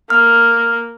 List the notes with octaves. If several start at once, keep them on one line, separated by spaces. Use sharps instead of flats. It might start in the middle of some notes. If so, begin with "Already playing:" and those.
A#3 F6